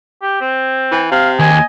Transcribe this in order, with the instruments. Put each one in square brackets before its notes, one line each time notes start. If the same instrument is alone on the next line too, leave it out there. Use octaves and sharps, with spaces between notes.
[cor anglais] G4
C4
[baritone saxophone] E3
[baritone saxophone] C3 [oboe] F5
[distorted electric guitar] D#2 [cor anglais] D#5 [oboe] G#5